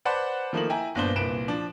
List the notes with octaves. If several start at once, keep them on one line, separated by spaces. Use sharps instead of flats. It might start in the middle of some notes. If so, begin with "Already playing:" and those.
B4 C5 D5 F#5 A5 B5
D#3 F3 A3 A#3 D#4 F#7
E4 G5 G#5 A#5
G1 A#2 B3 D4 C5 G7
C2 A#2 B4 D7 E7
F3 D4